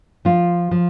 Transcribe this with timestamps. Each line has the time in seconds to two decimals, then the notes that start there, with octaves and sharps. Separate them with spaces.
0.25 F3 F4
0.71 F3